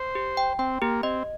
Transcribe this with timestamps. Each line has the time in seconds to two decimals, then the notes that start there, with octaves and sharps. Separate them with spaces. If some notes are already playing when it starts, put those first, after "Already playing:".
Already playing: C5
0.15 G4
0.37 G5
0.59 C4 G5
0.82 A#3 G4
1.03 C4 D#5